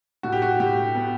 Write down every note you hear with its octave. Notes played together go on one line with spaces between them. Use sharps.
A2 F#4
G4
F#4
A2 G4
B3